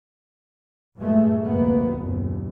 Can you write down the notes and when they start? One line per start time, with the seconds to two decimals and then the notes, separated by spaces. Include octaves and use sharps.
0.96 G2 A#2 G#3 A3
1.44 F1 D2 A#3 B3
1.93 F#1 D#2 A#2